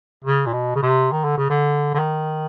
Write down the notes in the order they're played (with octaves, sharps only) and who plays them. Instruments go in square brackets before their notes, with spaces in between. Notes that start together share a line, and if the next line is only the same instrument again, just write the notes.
[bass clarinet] C#3
A#2
B2
C#3
C3
D#3
D3
C#3
D3
D3
D#3